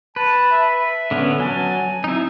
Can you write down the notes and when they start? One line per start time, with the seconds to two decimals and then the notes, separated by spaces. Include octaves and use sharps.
0.16 B4 A5
0.51 E5
1.11 D3 B3 C#4
1.40 F#3 G#5 A5
2.04 C4 D#4 E4